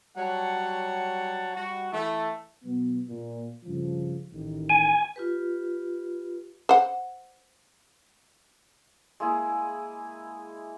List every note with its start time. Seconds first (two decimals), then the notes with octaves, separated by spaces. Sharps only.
0.17 F#3 G3 C#5 F#5 A5
1.55 G3 F#4
1.92 E3 A3
2.64 B2 F#3 B3
3.09 A#2
3.65 G2 C#3 F3
4.31 A1 D#3
4.70 G#5
5.16 F4 G4 B4
6.69 C5 F#5
9.20 G#3 A#3 E4 G#4